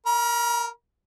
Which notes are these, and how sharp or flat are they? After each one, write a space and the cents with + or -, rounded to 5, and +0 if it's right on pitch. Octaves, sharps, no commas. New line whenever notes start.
A#4 -10 A#5 +45